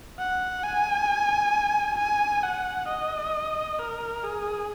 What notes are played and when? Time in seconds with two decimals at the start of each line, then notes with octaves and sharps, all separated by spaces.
0.19 F#5
0.63 G#5
1.98 G#5
2.43 F#5
2.88 D#5
3.79 A#4
4.24 G#4